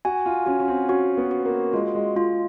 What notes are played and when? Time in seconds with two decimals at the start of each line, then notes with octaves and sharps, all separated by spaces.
0.05 F#4 G#5
0.26 F4
0.46 C#4 F#4
0.60 C#4
0.68 C4
0.89 C#4 F#4
1.17 B3
1.31 F#4
1.45 A#3
1.73 G#3 F4
1.95 G#3
2.16 G#3 F4